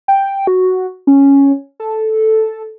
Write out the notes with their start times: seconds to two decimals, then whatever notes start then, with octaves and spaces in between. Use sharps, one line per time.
0.08 G5
0.47 F#4
1.07 C#4
1.80 A4